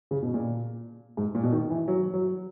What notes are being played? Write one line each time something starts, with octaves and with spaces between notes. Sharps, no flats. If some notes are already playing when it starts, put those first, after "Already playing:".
C#3
B2
A#2
G#2
A#2
B2
D#3
E3
F#3
F#3